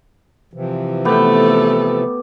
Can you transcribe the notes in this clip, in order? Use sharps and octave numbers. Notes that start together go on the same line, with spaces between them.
C3 E3 F3
A3 B3 G4 A4